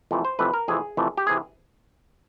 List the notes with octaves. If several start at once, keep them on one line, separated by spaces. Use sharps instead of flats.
F2 C3 E3 A3
C5
F2 C3 E3 A3 B4
A#4
F2 C3 E3 A3 G#4
F2 C3 E3 A3
G4
C3 E3 G#4